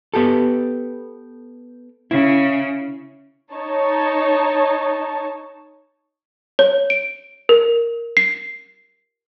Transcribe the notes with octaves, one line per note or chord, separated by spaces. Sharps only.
B3 G4 A4
C#3 E4
D#4 C#5 A5
C#5
D7
A#4
C7